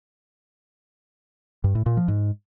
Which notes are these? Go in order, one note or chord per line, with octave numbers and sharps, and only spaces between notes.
G2
A2
A#2
F3
G#2